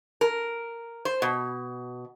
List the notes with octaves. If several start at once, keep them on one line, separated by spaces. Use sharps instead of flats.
A#4
C5
B2